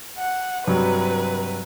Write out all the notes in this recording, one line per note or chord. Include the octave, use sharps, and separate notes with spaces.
F#5
G2 C3 F#3 B4